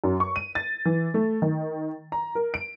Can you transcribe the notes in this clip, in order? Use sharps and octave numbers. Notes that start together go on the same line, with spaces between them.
F#2
C#6
D#7
A6
E3
A3
D#3
A#5
A#4
D7